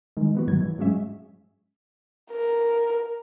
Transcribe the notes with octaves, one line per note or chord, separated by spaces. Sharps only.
D#3 G#3
E3 B3 F#4
G#2 D#3 F#3 G#6
E3
G#2 F#3 G#3 C#4 E5
A#4